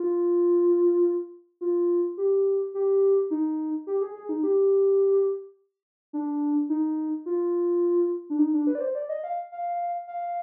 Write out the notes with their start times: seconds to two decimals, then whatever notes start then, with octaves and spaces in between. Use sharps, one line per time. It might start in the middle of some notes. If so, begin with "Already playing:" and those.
Already playing: F4
1.61 F4
2.18 G4
2.74 G4
3.31 D#4
3.87 G4
4.01 G#4
4.15 G#4
4.29 D#4
4.43 G4
6.13 D4
6.69 D#4
7.26 F4
8.30 D4
8.39 D#4
8.53 D4
8.67 B4
8.75 D5
8.80 C5
8.95 D5
9.09 D#5
9.24 F5
9.52 F5
10.08 F5